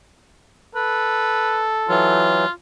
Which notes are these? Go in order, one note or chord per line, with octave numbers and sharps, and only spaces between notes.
A4 B4
E3 F#3 F4